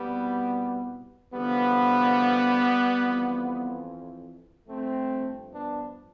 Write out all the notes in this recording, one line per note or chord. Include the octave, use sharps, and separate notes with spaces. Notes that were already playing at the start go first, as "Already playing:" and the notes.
Already playing: C2 B2 G3 B3
E2 D3 F3 G3 B3
F2 E3
G2 F3 A3 C4
B3 D4